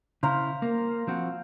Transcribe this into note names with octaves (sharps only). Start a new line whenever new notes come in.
C#3 E4 C5 F5 A#5
A#3
F3 C4 F#4